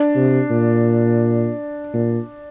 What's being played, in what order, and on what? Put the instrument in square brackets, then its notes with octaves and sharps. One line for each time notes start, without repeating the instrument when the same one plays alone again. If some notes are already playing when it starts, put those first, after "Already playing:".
Already playing: [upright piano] D4
[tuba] C3
A#2
A#2